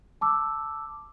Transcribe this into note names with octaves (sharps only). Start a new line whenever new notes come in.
A5 D6 E6